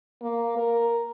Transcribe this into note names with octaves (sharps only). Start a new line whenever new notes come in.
A#3
A#4